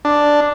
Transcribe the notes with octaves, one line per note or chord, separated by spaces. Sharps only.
D4